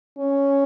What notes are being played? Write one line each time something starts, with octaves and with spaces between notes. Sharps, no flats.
C#4